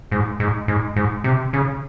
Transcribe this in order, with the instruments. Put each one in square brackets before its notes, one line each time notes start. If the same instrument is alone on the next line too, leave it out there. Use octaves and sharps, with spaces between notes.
[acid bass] G#2
G#2
G#2
G#2
C3
C#3